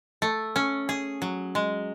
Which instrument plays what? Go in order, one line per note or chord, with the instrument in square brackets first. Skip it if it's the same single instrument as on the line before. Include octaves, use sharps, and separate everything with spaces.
[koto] A3
C#4
G#4
F#3
G#3